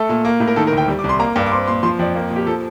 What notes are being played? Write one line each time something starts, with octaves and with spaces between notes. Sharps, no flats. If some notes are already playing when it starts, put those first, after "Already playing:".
Already playing: A3 A4
A#2
A#3
A2
A#4
D#3 A4
A#4
D2 G5
G3
D6
C2
C6
A#3 A#5
G2
D6
C4 C6
A#2 C6
F3 C6
F2 D5
A#3
A#2
G4
F3 A4